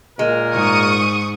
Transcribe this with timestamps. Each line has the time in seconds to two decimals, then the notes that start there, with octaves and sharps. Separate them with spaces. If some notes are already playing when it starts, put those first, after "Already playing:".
0.19 A#2 G#3 A#4
0.54 G#2 C#6 D#6